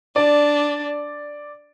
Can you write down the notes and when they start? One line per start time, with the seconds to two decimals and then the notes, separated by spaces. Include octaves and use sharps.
0.16 D4 D5